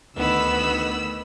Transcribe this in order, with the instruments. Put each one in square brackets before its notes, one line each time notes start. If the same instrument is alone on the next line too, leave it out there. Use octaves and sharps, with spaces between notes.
[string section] D2 D#3 E6 [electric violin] B3 B5